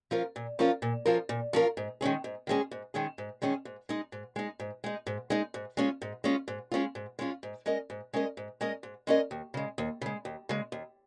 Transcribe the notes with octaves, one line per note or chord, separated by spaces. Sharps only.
F3 C#4 F4 A#4
A#2
F3 C#4 F4 A#4
A#2
F3 C#4 F4 A#4
A#2
F3 C#4 F4 A#4
G#2
D#3 G#3 C#4 G#4
G#2
D#3 G#3 C#4 G#4
G#2
D#3 G#3 C#4 G#4
G#2
D#3 G#3 C#4 G#4
G#2
G#3 D#4
G#2
G#3 D#4
G#2
G#3 D#4
G#2
G#3 D#4
G#2
G#3 C#4 F4
G#2
G#3 C#4 F4
G#2
G#3 C#4 F4
G#2
G#3 C#4 F4
G#2
G#3 C#4 A#4 D#5
G#2
G#3 C#4 A#4 D#5
G#2
G#3 C#4 A#4 D#5
G#2
G#3 C#4 A#4 D#5
D#2
C#3 G#3
D#2
C#3 G#3
D#2
C#3 G#3
D#2